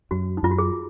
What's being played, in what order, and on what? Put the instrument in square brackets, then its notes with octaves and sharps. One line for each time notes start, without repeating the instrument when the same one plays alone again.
[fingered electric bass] F#2 [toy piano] F#4
[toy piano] D#4
[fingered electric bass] F#2 [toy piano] F4
[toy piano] F#4
G#4